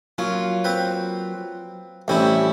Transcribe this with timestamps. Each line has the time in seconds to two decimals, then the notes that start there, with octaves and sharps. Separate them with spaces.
0.18 F#3 A#3 C#4 F4
0.64 C4 B4
2.08 A1 G3 C4 C#4 E4